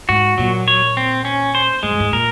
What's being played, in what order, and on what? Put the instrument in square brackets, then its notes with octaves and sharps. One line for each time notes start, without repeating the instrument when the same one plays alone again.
[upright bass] G#2 [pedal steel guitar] F#4
[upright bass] A#2 [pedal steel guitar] F#3
[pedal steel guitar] C#5
C4
C#4
C5
[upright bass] G#2 [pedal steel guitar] G#3
[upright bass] F#2
G#2
[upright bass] A#2 [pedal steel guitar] A#4